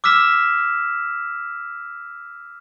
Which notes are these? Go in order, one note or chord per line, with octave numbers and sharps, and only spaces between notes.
D6 E6 F6 B6 E7